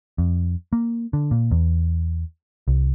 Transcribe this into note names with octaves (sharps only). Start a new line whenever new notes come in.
F2
A#3
D3
A#2
E2
C2